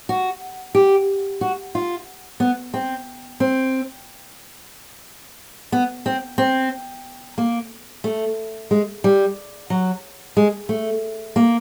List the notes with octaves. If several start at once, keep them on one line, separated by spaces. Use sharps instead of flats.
F#4
G4
F#4
F4
B3
C4
C4
B3
C4
C4
A#3
A3
G#3
G3
F#3
G#3
A3
A#3